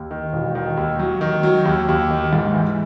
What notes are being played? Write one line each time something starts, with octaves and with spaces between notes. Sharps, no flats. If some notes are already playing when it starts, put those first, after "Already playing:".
Already playing: D#2
D#3
E1
D#3
D#2
F#3
D#3
F#3
D#2
D#2
D#3
G#2
E3